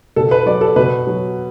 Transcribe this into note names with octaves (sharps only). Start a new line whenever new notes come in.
B2 A4
B4
F#3 D5
A4
B2 B4
F#3